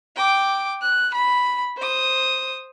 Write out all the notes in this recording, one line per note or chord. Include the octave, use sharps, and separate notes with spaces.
G5 D6
F#6
B5
C5 D#6